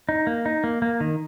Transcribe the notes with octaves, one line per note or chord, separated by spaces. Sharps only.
D#4
A#3
D#4
A#3
A#3
D#3